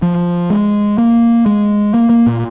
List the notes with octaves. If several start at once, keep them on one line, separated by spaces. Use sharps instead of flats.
F3
G#3
A#3
G#3
A#3
A#3
A#2